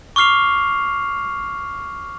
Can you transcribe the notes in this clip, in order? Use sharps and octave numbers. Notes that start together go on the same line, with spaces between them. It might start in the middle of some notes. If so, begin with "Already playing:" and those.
C#6 D6 F6 C7 F7